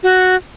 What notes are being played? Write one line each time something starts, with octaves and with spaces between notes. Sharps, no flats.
F#4